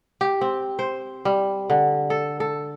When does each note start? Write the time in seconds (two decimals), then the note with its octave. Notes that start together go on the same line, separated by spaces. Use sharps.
0.21 G4
0.41 C4
0.79 C5
1.25 G3
1.70 D3
2.10 A4
2.40 A4